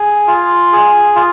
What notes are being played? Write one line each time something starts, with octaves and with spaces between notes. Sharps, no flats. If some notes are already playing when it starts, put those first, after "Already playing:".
Already playing: G#4
F4
G#4
F4